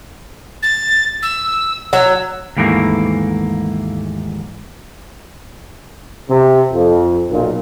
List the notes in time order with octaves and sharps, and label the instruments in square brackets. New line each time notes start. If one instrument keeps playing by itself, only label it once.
[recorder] A6
E6
[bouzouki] F#3 [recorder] E6
[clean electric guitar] D#2 G#2 E3 A3 A#3
[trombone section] C3
F2
B1 A#2